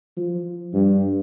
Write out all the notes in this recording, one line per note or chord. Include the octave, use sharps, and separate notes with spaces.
F3
G2